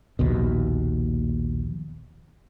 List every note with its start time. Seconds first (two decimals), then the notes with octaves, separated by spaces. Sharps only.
0.19 A#1 D#2 B2